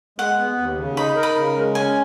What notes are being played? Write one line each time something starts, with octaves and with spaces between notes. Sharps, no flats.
G#3 F#5
B3
D#2
C#3
D#4 B5
A#4
B5
C#3
G#3
C#4 G#5